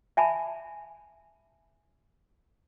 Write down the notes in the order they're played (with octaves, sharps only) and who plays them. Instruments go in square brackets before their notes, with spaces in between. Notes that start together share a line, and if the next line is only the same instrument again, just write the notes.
[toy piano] E5 G#5 A5 B5